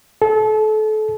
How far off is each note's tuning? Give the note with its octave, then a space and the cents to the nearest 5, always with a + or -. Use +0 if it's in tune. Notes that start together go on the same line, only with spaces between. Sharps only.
A4 -30